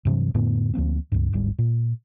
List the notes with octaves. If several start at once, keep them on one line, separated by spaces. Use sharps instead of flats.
G2 C3 E3 F#3
F2 A2 D3 B3
D2 F3 A#3 C4
C#2 G2
D1 G1 G#2 G3
A#2